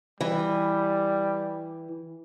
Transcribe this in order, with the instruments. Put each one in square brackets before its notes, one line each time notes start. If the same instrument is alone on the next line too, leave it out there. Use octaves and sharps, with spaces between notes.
[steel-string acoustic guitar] E3 [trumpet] G3